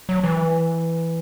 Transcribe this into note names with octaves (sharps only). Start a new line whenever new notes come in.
F#3
E3